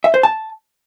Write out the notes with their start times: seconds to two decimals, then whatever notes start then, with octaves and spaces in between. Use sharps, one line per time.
0.04 E5
0.14 C5
0.23 A5